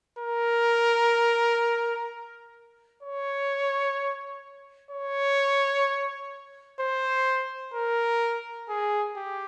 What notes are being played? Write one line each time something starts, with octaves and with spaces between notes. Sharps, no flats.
A#4
C#5
C#5
C5
A#4
G#4
G4